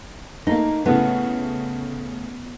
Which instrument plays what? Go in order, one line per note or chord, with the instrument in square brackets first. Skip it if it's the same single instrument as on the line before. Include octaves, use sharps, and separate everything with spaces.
[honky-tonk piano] A3 A#3 [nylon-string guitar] D#4
[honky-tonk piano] A2 C#3 A3 [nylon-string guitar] B3